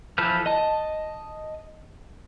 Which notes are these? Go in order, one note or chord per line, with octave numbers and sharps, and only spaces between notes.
E3 F3 A4 B4 F6
D#5 A5